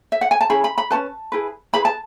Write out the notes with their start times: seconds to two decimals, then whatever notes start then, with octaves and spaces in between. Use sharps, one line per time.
0.12 E5
0.21 F#5
0.31 G#5
0.41 A5
0.49 C#4 E4 G#4 B5
0.64 B5
0.78 B5
0.91 C#4 F#4 B4 A5
1.32 E4 G#4 B4
1.73 E4 G#4 B4 B5
1.85 A5